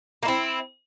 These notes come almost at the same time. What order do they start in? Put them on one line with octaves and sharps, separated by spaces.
A#3 E4 C4